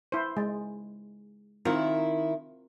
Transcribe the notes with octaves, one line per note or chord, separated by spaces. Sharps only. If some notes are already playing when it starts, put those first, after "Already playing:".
E4 C5
G#3
D#3 C4 E4 F4 A#4